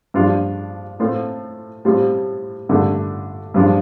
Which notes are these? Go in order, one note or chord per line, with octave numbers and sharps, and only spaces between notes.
G2 F3 D4 F4
A2 A3 C4 F4
A2 G3 C4 F4
G2 D3 A3
G2 F3 D4 F4